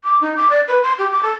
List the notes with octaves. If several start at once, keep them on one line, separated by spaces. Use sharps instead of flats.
D6
D#4
D6
D5
B4
C6
G4
D6
A4